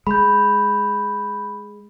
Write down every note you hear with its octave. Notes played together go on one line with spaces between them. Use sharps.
G#3 B5 G6